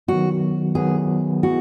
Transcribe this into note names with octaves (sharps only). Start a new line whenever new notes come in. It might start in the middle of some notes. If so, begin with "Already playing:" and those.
D#3 F#3 B3 F#4
D#3 F#3 B3 G#4
B3 E4 F#4 G#4